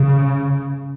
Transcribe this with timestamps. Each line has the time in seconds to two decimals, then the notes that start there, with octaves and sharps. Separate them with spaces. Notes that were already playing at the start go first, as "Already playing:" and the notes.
Already playing: C#3